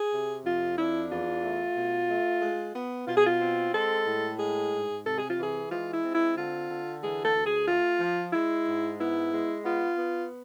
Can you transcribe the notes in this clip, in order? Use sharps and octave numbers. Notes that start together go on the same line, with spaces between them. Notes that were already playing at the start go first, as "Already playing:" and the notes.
Already playing: G#4
C3
F2 F4
D4 E4
E2 F4
A3
B2
A3
G#3
B3
B2 F4
G#4
F4
C4
G#3 A4
A2
G#3 G#4
G#2
C3 A4
G#4
F4
E3 G#4
G#3 F4
E4
C4
E4
D3 F4
D3
E3 G#4
A4
D2
G#4
A3 F4
F3
G#3 E4
G#2
B3 E4
G#3
B3 F4
B3